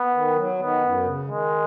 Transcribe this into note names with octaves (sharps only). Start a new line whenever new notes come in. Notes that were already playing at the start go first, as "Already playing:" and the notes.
Already playing: B3
D#3
F#3
D#3 B3
F#2
C#3
D#3 G#3